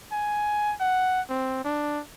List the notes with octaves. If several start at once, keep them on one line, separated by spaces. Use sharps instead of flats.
G#5
F#5
C4
D4